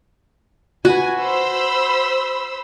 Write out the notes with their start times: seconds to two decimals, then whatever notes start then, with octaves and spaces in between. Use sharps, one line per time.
0.85 F#4 B4 G#5
1.19 C5 B5 E6